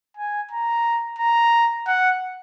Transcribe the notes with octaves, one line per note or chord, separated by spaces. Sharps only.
G#5
A#5
A#5
F#5